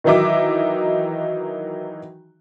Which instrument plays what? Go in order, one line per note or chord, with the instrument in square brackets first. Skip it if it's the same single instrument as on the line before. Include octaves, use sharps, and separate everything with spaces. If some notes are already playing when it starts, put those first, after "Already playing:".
[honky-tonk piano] D#3 E3 F#3 D#4 E5 D6